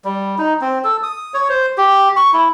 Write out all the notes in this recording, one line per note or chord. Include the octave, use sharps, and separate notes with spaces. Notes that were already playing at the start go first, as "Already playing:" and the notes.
G3
D#4
C4
A4
D#6
C#5
C5
G4
C#6
E4